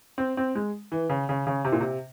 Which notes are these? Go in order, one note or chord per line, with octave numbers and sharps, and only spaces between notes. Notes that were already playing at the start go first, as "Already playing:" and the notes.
C4
C4
G#3
E3
C#3
C#3
C#3
C3
A#2
C3